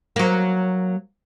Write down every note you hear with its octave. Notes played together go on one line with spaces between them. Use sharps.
F#3 A#3